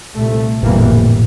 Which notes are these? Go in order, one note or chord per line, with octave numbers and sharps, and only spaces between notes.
C2 A#2 A3
G1 F2 A#2 E3 G3 A#3
A2
A#2